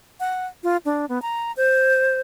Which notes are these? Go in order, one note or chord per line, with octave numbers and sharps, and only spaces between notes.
F#5
F4
D4
B3
A#5
C5